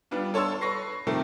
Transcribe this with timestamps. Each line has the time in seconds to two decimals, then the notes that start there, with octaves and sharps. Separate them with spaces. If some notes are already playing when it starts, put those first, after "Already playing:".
0.11 G3 B3 D4 F4
0.34 A4 C#5 A5 C6 E6
0.61 B4 C#6 A#6 C7
1.07 C3 D#3 A3 C4 A4 A#4